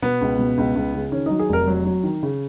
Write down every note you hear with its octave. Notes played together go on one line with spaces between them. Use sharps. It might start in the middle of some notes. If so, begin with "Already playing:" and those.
B2 B3
C#2
B2
C#2
C#2
C#3
D#3 C#4
F#3 D#4
G#4
F1 A#4
F#3
F#3
D#3
C#3